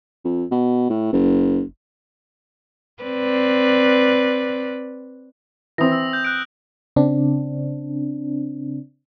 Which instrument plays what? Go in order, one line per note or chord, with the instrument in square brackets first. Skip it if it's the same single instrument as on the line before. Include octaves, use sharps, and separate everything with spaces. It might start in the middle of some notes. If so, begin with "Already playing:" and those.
[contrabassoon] F2
B2
A2
F#1
[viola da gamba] C4 B4 D5
[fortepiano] E3 C4 [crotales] D#6 A#6
[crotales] E6
G6
F#6 D7
[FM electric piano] C#3 C4 D4